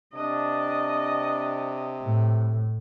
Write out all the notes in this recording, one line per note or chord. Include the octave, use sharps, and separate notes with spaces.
C3 D4 D#5
A2